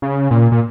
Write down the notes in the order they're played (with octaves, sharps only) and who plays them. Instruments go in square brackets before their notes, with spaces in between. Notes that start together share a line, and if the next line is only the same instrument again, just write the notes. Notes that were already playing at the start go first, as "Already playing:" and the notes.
[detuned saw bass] C#3
A#2
A#2